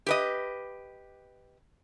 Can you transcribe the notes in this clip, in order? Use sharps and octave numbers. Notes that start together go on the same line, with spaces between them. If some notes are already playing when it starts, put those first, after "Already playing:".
G4 B4 D#5